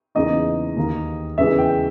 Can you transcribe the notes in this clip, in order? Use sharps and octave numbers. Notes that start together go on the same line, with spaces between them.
E2 C#3 E3 A#3 D#4 D#5
D#2 D#3 A#3
E2 C#3 E3 G#3 E5
G5